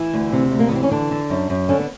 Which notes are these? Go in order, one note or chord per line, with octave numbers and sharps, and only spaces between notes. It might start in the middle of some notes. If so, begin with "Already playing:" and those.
Already playing: E3 E4
D2
C3
D2
A#3
B3
E3 C4
C#4
D3 D4
D3
F#2
F#2
D3 C#4
B3